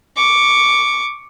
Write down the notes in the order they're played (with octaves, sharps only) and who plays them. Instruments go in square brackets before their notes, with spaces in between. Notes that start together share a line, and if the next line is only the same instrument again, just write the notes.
[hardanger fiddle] C#6 D6